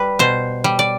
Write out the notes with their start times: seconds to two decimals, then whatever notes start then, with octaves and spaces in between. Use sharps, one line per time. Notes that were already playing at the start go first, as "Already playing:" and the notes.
Already playing: G3 B4
0.19 B2 C5
0.64 G3
0.79 D5